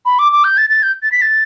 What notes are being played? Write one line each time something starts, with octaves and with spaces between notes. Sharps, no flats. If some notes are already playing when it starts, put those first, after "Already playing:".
B5
D6
D6
G6
A6
A6
G6
A6
B6
A6